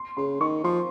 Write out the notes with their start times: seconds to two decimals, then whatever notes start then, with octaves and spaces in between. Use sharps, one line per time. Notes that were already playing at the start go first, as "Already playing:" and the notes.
Already playing: C6
0.17 C#3 C6
0.40 D#3 C#6
0.64 F3 C6